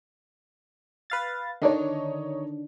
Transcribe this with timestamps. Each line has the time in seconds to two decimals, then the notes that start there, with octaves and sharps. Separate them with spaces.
1.10 B4 F5 A6
1.62 D3 D#3 D4 D#4 C#5